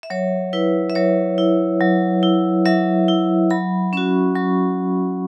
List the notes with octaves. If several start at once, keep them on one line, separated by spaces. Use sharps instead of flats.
E5
F#3 C#5
E4 B4
E5
F#3 C#5
E4
F#3
E4
F#3 E5
E4
F#3 B5
C#4 F#4 C#6
F#3 C#6